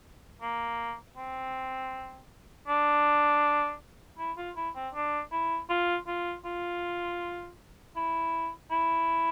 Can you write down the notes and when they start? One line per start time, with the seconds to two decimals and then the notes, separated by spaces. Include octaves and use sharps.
0.42 A#3
1.17 C4
2.68 D4
4.19 E4
4.37 F4
4.56 E4
4.76 C4
4.94 D4
5.32 E4
5.70 F4
6.07 F4
6.45 F4
7.96 E4
8.71 E4